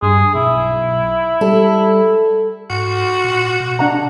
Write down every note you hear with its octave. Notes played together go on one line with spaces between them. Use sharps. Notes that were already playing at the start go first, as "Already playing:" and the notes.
G2 G#4
B1 E4
G3 A4
G#2 F#4
A#2
B2
C3 D4 F#5 A#5